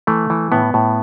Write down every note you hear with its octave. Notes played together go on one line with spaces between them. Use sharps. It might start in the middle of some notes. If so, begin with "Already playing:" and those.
E3 A3
E3
A2 B3
A2